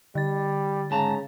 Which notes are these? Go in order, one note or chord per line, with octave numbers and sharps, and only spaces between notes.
D3 G3 A6
G#2 C#3 A5 A#5